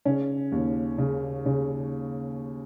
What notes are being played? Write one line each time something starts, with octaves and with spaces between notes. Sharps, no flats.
C#3 C#4
D#2
C#3
C#3